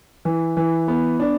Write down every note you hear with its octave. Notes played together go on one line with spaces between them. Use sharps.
E3
E3
B3
D4